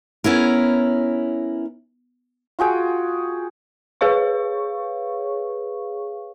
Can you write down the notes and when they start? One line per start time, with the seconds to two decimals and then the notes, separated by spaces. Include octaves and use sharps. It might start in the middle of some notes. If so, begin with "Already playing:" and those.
0.24 B3 C#4 E4 A#4
2.59 F4 F#4 G#4 G5
4.01 G#4 B4 C#5 F5 C#6